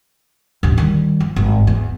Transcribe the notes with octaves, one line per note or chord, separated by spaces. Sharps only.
A1 D2
D#3 G3
F3
G#1
E2